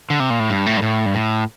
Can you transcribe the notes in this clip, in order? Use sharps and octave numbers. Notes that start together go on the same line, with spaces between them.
D3
C3
A#2
A2
G2
A2
G2
A2
G2
A2